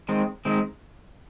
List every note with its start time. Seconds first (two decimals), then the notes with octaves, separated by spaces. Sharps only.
0.09 D#3 G#3 C4
0.45 D#3 G#3 C4